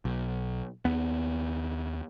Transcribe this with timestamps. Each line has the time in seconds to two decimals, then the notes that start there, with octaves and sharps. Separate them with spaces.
0.05 B1
0.85 D#2 B3